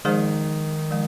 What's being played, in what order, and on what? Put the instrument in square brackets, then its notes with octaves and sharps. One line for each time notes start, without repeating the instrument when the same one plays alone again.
[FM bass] D#3 [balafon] F3 G#3 D#4 G#4 C5
[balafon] F3 G#3